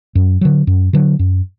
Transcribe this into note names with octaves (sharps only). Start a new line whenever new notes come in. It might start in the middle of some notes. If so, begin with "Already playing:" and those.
F#2
D3 F#3
F#2
D3 F#3
F#2